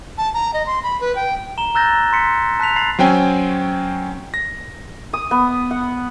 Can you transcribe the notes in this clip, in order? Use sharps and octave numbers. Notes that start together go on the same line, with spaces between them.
A5
A#5
D#5
C6
B5
B4
G5
A#5 E7 G7
A#5 E6 F#6 G6 A6 A#6
C6 B6 C#7
A5 F#6 B6 F7
B5 A6 C7
F#3 C4 C#4 G5 G#5
A#6
D#6
B3
F#5